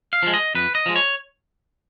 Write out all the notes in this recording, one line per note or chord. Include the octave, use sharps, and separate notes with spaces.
F5
F3 G#3
D#5
F2 B4
D#5
F3 G#3
C#5